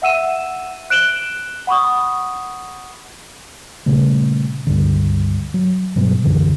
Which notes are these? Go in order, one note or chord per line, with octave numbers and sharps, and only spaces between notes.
E5 F#5 E6 D#7 E7
F#6 D7 E7 F#7 G7
F#5 B5 C#6 D#6
A#2 C#3 G3 A3
C#2 G2 D3 B3
F#3
G2 B2 F#3 G#3
C2 F#2 D3 E3